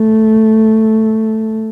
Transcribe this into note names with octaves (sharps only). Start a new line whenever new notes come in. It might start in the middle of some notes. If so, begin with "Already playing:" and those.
Already playing: A3